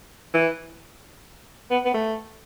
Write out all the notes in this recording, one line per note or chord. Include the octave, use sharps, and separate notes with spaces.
E3
B3
B3
A3